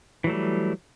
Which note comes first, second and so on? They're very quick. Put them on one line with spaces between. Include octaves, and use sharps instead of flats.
E3 F#3 A3 G3